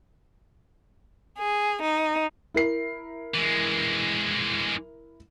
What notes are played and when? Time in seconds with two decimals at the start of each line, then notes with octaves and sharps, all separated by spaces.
1.37 G#4
1.82 D#4
2.54 E4 A#4 C7
3.35 E3 G#3